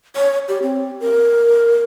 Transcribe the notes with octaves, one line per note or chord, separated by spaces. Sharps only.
C#5
G4
C4
A#4